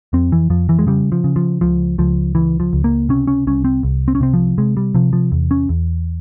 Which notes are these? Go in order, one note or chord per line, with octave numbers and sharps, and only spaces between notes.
F2 C4
E3
F2 F3
E3
G#3
C#3 G3
F3
C#3
F3
C#2 F3
C#2 F3
C#2 E3
F3
C#2
A#3
C3 C#4
C#4
C2 C#4
C4
C2
C4
C#4
C3 C4
F3
C3 G#3
G3
C3 F3
F3
E2
C#4
E2